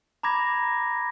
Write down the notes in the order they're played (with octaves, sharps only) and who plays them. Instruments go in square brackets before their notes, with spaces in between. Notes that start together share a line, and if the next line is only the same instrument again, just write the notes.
[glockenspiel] A#5 B5 D6 G#6 A#6